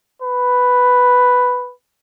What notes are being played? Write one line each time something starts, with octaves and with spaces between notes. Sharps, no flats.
B4